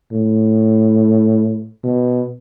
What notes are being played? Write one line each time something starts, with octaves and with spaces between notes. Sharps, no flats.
A2
B2